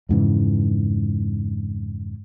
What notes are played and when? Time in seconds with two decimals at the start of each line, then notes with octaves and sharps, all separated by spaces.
0.09 F2 G#2 C#3 E3